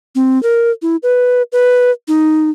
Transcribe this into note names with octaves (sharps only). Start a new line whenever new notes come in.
C4
A#4
E4
B4
B4
D#4